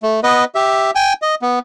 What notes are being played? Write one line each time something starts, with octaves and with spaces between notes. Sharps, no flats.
A3
B3 B4 D#5
G4 E5
G5 G#5
D#5
B3